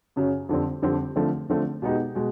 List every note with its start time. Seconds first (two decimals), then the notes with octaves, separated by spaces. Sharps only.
0.16 F#2 C#3 F#3
0.49 F2 D3 G3 C4
0.82 F2 D3 G3 C4
1.16 D3 F3 A3 C4
1.50 D3 F3 A3 C4
1.82 B2 G#3 B3 D#4 G4
2.15 B2 G#3